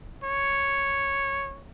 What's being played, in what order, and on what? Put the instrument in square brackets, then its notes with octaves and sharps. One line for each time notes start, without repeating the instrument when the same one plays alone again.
[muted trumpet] C#5